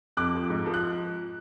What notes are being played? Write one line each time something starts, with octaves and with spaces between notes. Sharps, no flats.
F2 D6 F#6
F3
G#2
F3
F#6